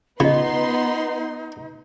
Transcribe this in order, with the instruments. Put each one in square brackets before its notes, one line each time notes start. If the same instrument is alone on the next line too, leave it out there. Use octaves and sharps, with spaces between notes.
[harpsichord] C#3 [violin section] B3 C6 [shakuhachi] D#4 [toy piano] F4 D#5